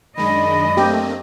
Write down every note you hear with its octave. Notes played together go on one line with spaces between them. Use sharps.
F#2 D#3 G#3 D4 D#5 B5
A3 A#3 C4 G4